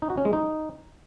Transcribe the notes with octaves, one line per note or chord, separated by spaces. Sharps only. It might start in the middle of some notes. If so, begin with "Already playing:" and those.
D#4
F#4
C#4
G#3
D#4